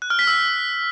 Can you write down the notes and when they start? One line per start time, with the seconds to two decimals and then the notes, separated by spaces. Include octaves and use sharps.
0.02 F#6
0.10 F6
0.19 B6
0.27 E6